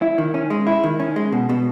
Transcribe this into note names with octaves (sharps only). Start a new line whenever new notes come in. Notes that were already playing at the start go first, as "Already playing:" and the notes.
E4
D#3
C#4
G#3
E4
D#3
C#4
G#3
B2
B2